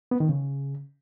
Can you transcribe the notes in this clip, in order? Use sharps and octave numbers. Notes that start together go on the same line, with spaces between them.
B3
D#3
C#3